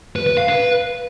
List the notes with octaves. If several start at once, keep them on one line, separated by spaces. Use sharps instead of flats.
B4
B4
F5
B4